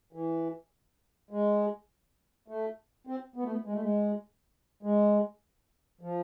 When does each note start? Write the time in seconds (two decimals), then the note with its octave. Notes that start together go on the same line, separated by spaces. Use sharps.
0.13 E3
1.31 G#3
2.48 A3
3.07 C4
3.36 B3
3.44 A3
3.52 B3
3.65 G#3
3.73 A3
3.81 G#3
4.83 G#3
6.01 F3